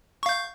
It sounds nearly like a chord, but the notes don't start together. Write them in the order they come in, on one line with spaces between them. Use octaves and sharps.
C#6 F5 G6